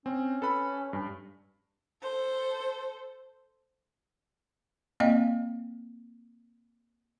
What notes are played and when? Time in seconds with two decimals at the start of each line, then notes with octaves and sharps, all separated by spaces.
0.06 C4 C#4
0.42 A4 B4 B5
0.93 G2
2.02 A4 C5
5.00 A#3 C4 D5 D#5 F5 G5